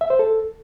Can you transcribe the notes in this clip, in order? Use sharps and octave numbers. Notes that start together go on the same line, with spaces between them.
E5
C5
A4